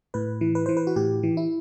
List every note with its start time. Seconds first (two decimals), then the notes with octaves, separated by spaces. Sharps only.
0.14 A2 B4
0.41 E3
0.55 B4
0.66 E3 C5
0.77 B4
0.87 F#4
0.96 A2 G4
1.23 E3
1.37 E4